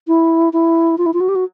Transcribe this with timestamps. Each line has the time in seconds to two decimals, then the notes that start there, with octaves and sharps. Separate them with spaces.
0.08 E4
0.53 E4
0.98 F4
1.06 E4
1.13 F4
1.20 F#4
1.29 G4
1.35 F#4